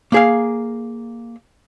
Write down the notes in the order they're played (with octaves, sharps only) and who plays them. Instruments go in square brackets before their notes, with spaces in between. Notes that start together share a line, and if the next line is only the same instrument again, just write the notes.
[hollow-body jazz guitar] A#3 G#4 F5